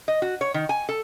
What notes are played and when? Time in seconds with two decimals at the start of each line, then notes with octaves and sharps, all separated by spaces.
0.08 D#5
0.22 F#4
0.41 C#5
0.54 D#3
0.69 G#5
0.89 A4